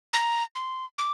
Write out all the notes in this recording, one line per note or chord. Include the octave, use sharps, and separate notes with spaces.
A#5
C6
D6